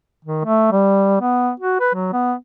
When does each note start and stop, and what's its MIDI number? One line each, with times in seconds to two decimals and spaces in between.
0.25 0.44 51
0.45 0.71 57
0.72 1.21 55
1.21 1.51 59
1.60 1.80 66
1.80 1.90 71
1.94 2.12 54
2.13 2.34 59